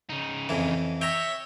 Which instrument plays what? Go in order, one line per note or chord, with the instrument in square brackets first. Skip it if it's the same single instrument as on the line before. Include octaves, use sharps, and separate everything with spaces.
[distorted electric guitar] C#3 D#4
[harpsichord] F2 E3
[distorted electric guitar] C#5 [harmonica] E5 [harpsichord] G5 A#5